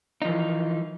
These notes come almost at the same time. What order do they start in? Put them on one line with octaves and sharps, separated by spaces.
D#4 F3 E3